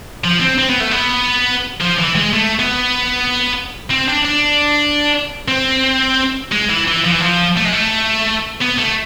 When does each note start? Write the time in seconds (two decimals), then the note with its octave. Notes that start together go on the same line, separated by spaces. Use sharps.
0.24 F3
0.41 C4
0.59 C4
0.70 B3
0.80 A3
0.91 B3
1.81 F3
1.99 E3
2.15 G#3
2.33 A3
2.59 B3
3.90 C4
4.08 D4
4.25 D4
5.48 C4
6.52 G#3
6.70 E3
6.88 E3
7.05 F3
7.12 E3
7.20 F3
7.57 A3
7.65 G#3
7.73 A3
8.62 B3
8.79 A3